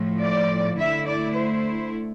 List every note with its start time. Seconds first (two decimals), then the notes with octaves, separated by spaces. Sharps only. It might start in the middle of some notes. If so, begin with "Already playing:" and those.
Already playing: A2 F3 A3
0.22 D5
0.79 D3 A3 E4 E5
1.07 D5
1.36 C5